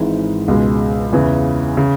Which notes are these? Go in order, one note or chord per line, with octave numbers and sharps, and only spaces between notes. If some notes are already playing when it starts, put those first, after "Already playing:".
Already playing: G#1 G#2 E3 G#3 D#4
C#2 B2 G#3
E2 C#3 E3
C#3